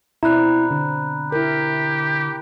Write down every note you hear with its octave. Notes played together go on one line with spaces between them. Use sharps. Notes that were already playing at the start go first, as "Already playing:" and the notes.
B2 C4 E4 D5 A#5 B5 F#6
D3
E4 G4 A#4